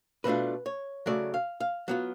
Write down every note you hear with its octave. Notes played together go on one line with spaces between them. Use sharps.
B2 A3 D4 F4 B4
C#5
C#3 F#3 A3 D5
F5
F5
F#3 B3 F4